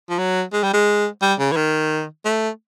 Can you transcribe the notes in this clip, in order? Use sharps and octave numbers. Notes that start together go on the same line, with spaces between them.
F3
F#3
G#3
G3
G#3
G3
C#3
E3
D#3
A3